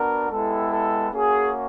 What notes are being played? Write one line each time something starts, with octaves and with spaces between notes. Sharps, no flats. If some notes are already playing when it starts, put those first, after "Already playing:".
Already playing: B3 D4 F#4 A#4
G#3 B3 E4 G4 A4
A4
A#3 C#4 F#4 G#4